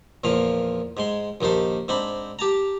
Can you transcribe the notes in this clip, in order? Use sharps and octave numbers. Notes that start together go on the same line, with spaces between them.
E2 A#2 F3 F5
G#2 G#3 C6
A#1 D#2 D#4 C5 A5
G#2 C4 D4 B5
G4 A5 A#5